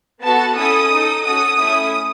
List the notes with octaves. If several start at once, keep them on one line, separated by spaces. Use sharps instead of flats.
B3 F#4 A4 A5
C#4 E4 A4 D#6
D#4 A4
C#4 F#4 A4 D#6
A3 C#4 E4